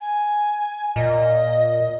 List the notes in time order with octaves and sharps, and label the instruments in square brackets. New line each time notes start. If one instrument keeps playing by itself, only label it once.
[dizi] G#5
[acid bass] A#2 [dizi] D#5